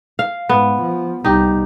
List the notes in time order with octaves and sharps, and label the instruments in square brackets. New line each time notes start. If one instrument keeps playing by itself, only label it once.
[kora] F5
[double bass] G#2 [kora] B3
[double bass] F3
[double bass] C2 G3 [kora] D#4 G4